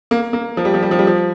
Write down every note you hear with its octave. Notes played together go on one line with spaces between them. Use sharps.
A#3
A#3
F3
G3
F3
G3
F3
G3
F3